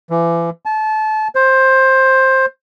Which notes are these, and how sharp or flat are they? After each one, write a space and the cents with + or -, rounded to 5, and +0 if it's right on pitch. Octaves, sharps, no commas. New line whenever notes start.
E3 +35
A5 -25
C5 +15